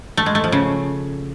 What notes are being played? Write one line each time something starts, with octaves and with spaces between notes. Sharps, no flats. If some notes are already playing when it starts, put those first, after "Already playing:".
A3
G#3
A3
F3
C#3